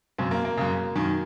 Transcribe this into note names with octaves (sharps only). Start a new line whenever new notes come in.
F#2 C#3 C4
A#3
A#3
F#2 C#3
F#2 D#3